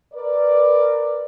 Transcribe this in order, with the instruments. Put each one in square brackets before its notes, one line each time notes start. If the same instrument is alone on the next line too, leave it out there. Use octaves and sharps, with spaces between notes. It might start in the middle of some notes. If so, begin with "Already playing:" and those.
[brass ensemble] A#4 B4 D5